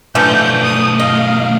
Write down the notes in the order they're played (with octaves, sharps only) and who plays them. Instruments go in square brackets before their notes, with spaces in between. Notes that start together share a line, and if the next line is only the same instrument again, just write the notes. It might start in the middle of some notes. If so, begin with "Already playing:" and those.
[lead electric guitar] B1 A3 [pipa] D3 E3 F3 [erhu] G6
[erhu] D#6
[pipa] D#5 [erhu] F5